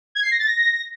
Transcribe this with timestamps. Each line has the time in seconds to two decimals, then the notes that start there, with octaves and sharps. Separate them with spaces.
0.15 G#6
0.23 C7
0.31 A#6
0.39 A6
0.47 A#6